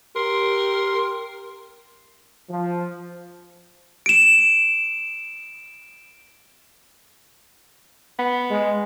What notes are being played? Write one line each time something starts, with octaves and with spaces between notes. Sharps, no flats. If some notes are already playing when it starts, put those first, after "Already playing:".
G4 A#4 C6
F3
D7 E7
B3
G#3